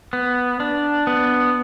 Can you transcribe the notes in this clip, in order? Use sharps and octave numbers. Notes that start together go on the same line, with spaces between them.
B3
D4
B3